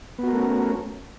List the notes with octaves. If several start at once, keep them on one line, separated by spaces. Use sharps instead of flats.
A3 B3 C#4 F#4 A#4